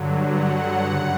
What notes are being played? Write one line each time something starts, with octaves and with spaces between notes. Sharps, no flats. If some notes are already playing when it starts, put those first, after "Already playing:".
Already playing: G2 D3 F#3
F#5
F#2 C#3 G3